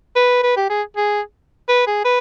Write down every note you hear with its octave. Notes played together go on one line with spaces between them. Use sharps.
B4
B4
G4
G#4
G#4
B4
G#4
B4